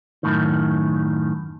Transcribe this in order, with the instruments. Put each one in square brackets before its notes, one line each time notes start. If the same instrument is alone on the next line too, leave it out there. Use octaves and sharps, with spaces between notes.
[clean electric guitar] F#2 A2 D#3